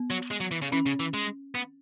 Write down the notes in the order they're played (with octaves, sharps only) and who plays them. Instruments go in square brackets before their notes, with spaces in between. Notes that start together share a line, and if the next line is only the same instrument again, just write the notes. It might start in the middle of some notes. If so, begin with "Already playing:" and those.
Already playing: [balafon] B3
[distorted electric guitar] F#3
G#3
F#3
E3
C#3
[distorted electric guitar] E3 [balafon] C#4
[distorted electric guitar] C#3
E3
G#3
B3